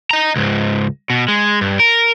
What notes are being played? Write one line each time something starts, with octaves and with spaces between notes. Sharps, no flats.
D#5 A#5
C#2 G#2
B2
G#3
G2
A#4